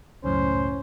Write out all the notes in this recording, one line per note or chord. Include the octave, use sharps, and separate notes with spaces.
C#2 F#2 A2 C#4 C5